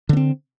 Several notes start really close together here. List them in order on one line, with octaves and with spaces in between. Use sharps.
D3 B3 C4